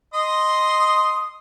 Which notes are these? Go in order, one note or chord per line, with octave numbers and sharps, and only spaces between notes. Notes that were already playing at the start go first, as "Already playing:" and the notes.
D#5 C6 D#6